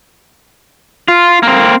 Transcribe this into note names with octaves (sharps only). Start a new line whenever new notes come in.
F4
A#3 C4